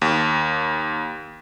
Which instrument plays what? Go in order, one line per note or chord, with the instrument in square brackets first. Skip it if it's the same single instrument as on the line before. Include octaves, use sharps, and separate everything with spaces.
[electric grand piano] D#2